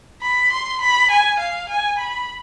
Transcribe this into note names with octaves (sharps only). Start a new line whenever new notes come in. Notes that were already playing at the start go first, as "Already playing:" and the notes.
B5
C6
B5
G#5
F5
G#5
B5